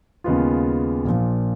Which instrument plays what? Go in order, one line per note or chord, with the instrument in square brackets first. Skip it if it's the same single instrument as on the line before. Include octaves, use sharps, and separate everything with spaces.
[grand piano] D#2 C#3 G#3 B3 F4
A#1 A#2 F3